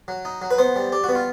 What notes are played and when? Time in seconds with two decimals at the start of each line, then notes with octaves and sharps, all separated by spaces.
0.08 F#3
0.25 D#4
0.42 F#3
0.51 B4
0.58 B3 C5
0.76 G3
0.92 G3 G4
1.04 B3 F#4
1.15 F4